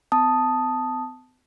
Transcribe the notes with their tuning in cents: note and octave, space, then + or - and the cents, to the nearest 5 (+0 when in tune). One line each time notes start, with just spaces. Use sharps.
B3 +45 A5 +0 D#6 +0